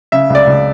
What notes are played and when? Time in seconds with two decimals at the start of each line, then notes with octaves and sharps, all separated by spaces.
0.12 C#3 E5
0.30 C#2 D5
0.47 C#2